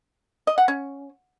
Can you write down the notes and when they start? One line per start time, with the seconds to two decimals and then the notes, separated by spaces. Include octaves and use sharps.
0.47 D#5
0.58 F#5
0.68 C#4